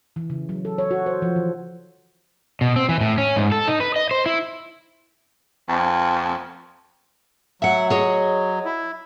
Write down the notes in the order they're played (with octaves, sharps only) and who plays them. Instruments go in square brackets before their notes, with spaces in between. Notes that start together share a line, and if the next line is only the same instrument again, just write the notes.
[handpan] E3
C#3
F#3
A4
C#5
F#4
C5
F3
E3
[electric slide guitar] B2
C4
E3
A2
C#4
G#2
A4
D#4
B4
D#5
C5
E4
[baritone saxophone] F2
[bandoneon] F#3 [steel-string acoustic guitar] E5 F#5
[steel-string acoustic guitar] G#4 C#5 D#5
[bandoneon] E4